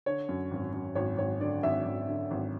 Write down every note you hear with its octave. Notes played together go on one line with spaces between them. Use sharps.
D3 C#5
F#2
G#1
F#2
G#1 C#5
G#1 C#5
D3 D5
G#1 E5
G#1
D3
G#1